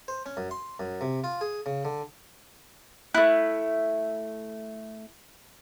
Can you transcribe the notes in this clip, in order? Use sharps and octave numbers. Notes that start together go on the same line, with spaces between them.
C5
C#4
F#2
C6
F#2
C3
F4
G#4
C#3
D3
A3 E4 F#6